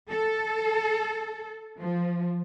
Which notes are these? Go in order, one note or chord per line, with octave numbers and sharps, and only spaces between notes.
A4
F3